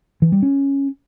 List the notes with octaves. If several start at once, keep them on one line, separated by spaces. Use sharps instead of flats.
E3
G3
C#4